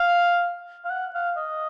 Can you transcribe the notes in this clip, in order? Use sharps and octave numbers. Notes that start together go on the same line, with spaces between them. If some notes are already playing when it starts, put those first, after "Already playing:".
Already playing: F5
F5
F#5
F5
D#5